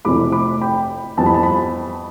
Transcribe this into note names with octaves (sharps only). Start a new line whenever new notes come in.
F1 F2 E3 A3 B5 D6
B5 D6
G5 B5
F2 E3 G3 B3 A5
B5
A5
B5